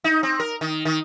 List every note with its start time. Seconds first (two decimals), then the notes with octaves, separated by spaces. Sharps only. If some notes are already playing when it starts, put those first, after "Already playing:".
0.04 D#4
0.23 C4
0.40 A#4
0.61 D#3
0.85 D#3